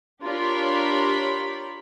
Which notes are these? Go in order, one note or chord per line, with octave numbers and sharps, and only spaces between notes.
D4 F4 G4 A#4 C#5 B5